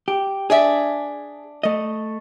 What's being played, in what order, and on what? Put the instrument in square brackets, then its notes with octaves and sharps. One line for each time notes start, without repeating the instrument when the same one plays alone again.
[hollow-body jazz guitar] G4
[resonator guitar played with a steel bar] D4 D5 E5 [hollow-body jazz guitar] G#4
[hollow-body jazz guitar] A3 D#5